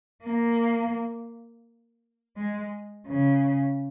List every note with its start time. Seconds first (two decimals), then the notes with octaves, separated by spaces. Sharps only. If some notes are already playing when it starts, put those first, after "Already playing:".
0.24 A#3
2.37 G#3
3.08 C#3